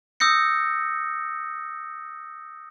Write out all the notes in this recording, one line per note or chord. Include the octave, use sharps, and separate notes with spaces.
D#6 E6 G6 A#6 C#7